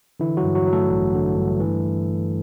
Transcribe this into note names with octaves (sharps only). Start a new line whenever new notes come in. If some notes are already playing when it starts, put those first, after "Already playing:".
D3 E3 E4
F#3 F#4
G2
F#3 F#4
F#3
A3 A4
A1
D3
G2
E3